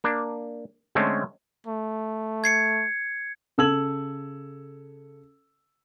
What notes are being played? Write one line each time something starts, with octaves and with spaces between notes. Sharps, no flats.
A#3 D4
D3 G#3 A3 C4 C#4
A3
G#6 C7 C#7
C#3 A4 E6 G#6 F#7